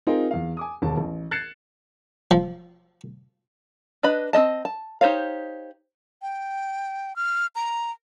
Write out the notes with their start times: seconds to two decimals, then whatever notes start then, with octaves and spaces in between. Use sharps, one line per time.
0.07 C4 D#4 F4 G#4 A#4 C5
0.31 E2 F5
0.57 G#5 D6 D#6
0.82 E1 D#2 A5
0.97 A1
1.31 F#6 G#6 A6 C7 C#7 E7
2.31 F3
4.03 D4 B4 D#5 B5
4.33 C4 E4 D#5 A5
4.65 A5
5.01 D#4 G4 C5 C#5 F5
6.22 G5
7.16 F6
7.55 A#5